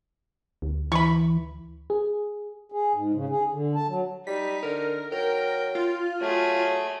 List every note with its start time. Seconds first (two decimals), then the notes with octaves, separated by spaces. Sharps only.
0.62 D2
0.92 E3 B5 C#6
1.90 G#4
2.72 G#4
2.94 G#2
3.14 C#3
3.29 G#4
3.52 D3
3.75 A5
3.89 F#3
4.27 G3 D#4 B6
4.63 D3 A#4
5.12 F#3 A#4 G5
5.75 F4
6.21 F#3 A3 G#4